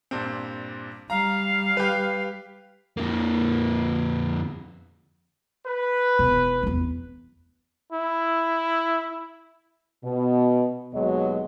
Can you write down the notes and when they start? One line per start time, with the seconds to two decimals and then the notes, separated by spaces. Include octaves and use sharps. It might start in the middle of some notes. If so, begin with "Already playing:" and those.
0.11 G2 A#2 C4
1.10 G3 F5 A#5
1.77 G4 B4
2.97 F2 A#3
5.66 B4
6.19 E1
6.63 E2 C4
7.92 E4
10.04 B2
10.94 D#2 B2 F#3 G#3 D#5